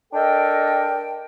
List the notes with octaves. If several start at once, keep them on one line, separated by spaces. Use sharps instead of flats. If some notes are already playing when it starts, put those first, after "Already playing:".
D4 A4 A#4 D#5 G5